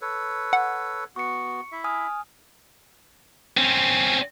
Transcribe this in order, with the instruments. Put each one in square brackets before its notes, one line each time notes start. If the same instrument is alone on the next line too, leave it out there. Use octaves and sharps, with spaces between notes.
[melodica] A4 B4 C#5
[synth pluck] F#5
[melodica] B3 F#4 [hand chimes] C#6 C#7
[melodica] E4 E5
[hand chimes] G#5 D#6 F6
[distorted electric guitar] C4 C#4